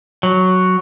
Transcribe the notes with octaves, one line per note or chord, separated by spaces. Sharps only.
F#3